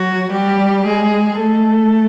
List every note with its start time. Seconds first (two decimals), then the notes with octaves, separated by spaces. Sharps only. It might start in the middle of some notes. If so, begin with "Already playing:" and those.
Already playing: F#3 F#4
0.31 G3 G4
0.86 G#3 G#4
1.39 A3 A4